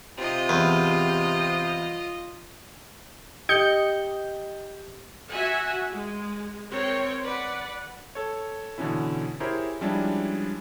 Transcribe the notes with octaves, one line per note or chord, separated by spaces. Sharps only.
C3 F4 D#5
E2
G4 D#5 G6 C#7
F#4 E5 F#5 G#5
G#3
C4 A#4 C#5 G5
B4 D5 F#5
A4 C#5
B2 D3 E3 C#4 E4
E4 G4 G#4 A#4 C5 C#5
F3 G3 G#3 C#4 D4 E4